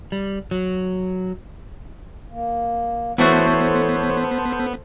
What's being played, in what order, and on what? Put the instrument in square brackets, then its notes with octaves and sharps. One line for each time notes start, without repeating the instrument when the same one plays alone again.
[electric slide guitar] G3
F#3
[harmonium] A#3
[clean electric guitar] E3 A3 F#4 [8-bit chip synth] B3 [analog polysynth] A4 C5 [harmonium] C#5